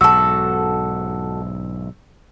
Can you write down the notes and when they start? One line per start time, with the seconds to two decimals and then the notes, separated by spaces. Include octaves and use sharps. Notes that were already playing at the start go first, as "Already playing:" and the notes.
0.01 B1 G#2 F#4 A4 E6